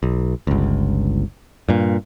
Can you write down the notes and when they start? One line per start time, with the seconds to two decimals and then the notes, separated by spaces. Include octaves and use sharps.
0.03 B1
0.47 G1 C#2
1.69 G2 A#2